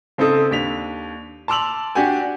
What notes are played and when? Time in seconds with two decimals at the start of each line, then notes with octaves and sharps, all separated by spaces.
0.18 C#3 C4 D#4 A4 D#6
0.51 D#2 D4 B6 F7
1.48 A5 C6 D6 E6 F7 F#7
1.95 D4 F#4 G4 F#5 G#5